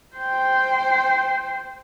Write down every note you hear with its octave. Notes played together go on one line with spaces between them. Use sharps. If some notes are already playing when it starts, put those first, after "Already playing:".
C5 G5